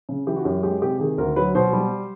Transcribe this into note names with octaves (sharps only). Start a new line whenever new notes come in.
C#3
E3 G4
F#4
F#2 G4
G#3 G4
C3 G4
D#3 G#4
D2 A#4
F#3 B4
B2 C5
G3